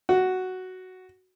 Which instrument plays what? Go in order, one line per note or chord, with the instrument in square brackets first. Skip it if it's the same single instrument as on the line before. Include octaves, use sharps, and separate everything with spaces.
[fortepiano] F#4